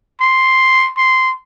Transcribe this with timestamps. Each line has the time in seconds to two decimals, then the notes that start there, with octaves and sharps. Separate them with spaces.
0.21 C6
0.97 C6